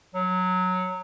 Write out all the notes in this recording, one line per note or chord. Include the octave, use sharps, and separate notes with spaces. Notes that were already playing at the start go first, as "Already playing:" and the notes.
F#3